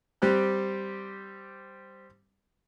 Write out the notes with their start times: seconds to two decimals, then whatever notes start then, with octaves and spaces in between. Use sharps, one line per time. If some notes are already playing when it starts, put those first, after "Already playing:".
0.22 G3 C4 G4 F#6